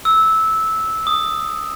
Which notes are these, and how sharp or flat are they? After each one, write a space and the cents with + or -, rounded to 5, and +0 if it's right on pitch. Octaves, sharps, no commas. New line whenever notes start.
E6 -15
D#6 -10